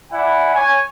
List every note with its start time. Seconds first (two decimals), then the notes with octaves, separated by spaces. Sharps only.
0.11 E4 D5 F#5 G#5 B5
0.55 C#5 G#5